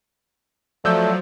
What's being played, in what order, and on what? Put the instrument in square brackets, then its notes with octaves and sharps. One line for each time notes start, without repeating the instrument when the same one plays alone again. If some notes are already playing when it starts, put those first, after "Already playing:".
[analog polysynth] F3 F#3 [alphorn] A3 [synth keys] D5 E6 G6